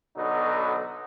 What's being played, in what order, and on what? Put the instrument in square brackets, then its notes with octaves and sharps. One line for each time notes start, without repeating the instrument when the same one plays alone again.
[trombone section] B1 B2 D3 F#3 B3 D#4